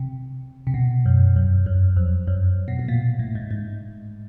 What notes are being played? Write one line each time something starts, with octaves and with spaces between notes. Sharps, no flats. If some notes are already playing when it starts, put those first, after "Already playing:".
Already playing: C3
C3
B2
F#2
F#2
F#2
F2
F#2
B2
B2
A#2
A2
G#2
G#2